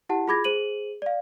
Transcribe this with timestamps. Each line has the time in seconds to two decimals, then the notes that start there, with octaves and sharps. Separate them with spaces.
0.09 E4 G4 F#5 A5
0.28 F4 G#4 B5 D6 G#6 A#6
0.44 G#4 C5 D#7 F#7
1.02 D5 F5